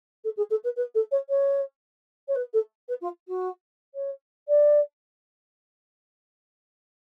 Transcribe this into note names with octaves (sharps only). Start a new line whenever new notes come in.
A4
G#4
A4
B4
B4
A4
C#5
C#5
C#5
B4
A4
B4
F4
F#4
C#5
D5